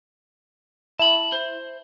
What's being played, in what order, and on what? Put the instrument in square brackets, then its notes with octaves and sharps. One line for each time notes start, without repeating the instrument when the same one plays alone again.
[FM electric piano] E4 [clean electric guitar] A5 B5
[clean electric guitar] C5